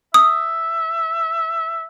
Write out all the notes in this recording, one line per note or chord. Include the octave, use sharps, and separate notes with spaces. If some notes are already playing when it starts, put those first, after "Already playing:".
E5 D#6